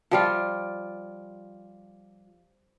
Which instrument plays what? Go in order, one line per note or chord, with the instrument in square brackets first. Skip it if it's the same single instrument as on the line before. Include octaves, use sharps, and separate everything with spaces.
[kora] F3 G3 F4